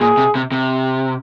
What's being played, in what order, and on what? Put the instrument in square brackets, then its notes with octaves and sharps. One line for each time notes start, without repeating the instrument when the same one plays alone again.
[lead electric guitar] A#2 [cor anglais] G#4
[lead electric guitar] C3
C3
C3